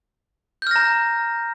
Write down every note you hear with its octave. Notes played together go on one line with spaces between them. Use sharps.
A#5 F6 G6 A#6